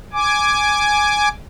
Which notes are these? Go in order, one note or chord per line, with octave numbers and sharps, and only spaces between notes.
G#5 D6